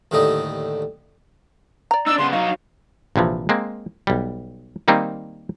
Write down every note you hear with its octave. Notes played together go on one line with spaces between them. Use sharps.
D#2 A2 D3 G3 D#4 D#5
D5 A#5
D4 D#4 E6
C#3 B3 C6
F#3 D#4 F5
A#1 C3 E3 F3
G#3 A#3 C4
B1 G3
D#3 G3 A#3 C4 D#4